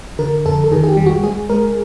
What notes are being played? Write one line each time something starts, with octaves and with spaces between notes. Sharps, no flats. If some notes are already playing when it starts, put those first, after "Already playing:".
D3 A#4
F2 A4
A4
D#3 G#4
G#4
G4
G3
F#4
G#3 G#4
G#3 A#4